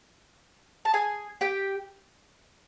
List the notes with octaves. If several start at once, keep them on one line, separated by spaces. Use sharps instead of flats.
A5
G#4 G#5
G4 G5